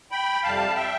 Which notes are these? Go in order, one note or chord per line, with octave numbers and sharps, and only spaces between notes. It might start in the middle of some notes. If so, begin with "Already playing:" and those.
G5 B5
F2 C3 G3 F5 A5
E5 G5